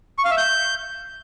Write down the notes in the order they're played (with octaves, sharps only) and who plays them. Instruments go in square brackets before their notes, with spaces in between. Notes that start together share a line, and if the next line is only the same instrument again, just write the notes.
[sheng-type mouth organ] C#6
F5
E5
G6